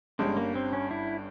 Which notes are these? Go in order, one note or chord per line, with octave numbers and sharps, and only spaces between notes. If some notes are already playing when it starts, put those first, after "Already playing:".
G1 G2 G3 G#3 C#4
A#3
C4
C#4
E4